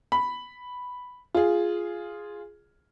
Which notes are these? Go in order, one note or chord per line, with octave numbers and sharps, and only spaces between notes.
B5
F4 G#4